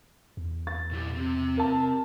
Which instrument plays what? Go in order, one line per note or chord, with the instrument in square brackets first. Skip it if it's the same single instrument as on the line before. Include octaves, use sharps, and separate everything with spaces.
[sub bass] E2
[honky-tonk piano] A6
[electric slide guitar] A#2 E4 G4
C4 G4
[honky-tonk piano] A#4 A5